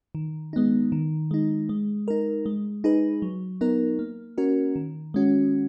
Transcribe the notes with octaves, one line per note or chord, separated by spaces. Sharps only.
D#3
G#3 B3 D#4
D#3
G#3 D#4
G#3
D#4 A#4
G#3
D#4 G#4 B4
F#3
B3 D#4 A#4
A#3
C#4 F#4 A#4
D#3
G#3 C#4 F#4